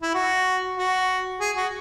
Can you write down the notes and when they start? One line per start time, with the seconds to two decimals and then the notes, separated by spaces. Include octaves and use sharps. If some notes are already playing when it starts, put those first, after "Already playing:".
0.02 E4
0.14 F#4
0.77 F#4
1.40 G#4
1.56 F#4